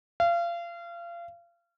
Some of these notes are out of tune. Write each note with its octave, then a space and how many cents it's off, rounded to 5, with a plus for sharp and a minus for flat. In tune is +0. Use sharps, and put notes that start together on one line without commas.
F5 -30